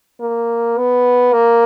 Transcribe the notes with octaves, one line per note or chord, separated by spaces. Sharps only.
A#3
B3
A#3